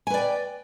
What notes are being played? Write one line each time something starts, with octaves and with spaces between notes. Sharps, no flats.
B4 D5 G5 G#5